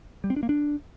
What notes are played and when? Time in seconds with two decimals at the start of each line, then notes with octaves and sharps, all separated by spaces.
0.24 G3
0.30 C4
0.36 D4
0.43 A#3
0.49 D4